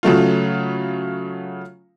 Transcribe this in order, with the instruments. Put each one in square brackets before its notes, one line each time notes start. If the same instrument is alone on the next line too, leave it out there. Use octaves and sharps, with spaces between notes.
[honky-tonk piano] C#3 F#3 A3 F4